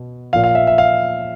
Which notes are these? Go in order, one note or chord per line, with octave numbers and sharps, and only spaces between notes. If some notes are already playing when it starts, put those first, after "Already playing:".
Already playing: B2
A#2 F3 F5
F5
E5
E5
F5